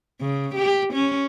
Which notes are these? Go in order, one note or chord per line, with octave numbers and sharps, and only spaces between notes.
C#3
G4
C#4